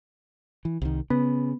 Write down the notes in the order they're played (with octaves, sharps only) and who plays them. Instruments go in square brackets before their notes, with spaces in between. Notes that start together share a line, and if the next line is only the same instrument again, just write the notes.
[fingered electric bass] E3
C2 D#3
[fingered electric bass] C#3 [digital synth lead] B3